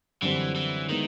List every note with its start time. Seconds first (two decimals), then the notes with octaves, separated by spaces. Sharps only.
0.22 F#2 D3 E3 G3 C4
0.55 E3
0.89 D#3 G#3 B3 E4